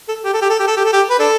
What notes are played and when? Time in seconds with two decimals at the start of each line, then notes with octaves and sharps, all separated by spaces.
0.09 A4
0.24 G4
0.34 A4
0.42 G4
0.50 A4
0.59 G4
0.67 A4
0.77 G4
0.85 A4
0.93 G4
1.10 B4
1.20 D4 A4